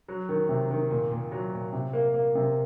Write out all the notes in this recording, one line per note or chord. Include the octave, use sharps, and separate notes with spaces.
F#3
D#3
C3
D#3
A#2
A#2
F#3
A#2
C3
A#3
A#3
C3